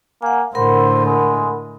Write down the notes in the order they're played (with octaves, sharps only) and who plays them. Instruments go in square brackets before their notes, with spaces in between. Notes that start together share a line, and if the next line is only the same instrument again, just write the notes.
[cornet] A#3 [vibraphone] F#5 G#5
[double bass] A2 D3 [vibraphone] A#4 F#5 B5 [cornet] C5
[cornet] G#3